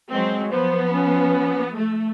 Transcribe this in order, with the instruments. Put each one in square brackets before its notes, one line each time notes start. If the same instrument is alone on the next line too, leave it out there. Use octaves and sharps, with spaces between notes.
[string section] F#3 C4 [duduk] G#3
[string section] F3 B3 [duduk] C5
[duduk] C#4
[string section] A3